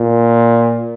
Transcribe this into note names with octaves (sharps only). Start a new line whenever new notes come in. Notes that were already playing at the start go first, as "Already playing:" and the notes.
Already playing: A#2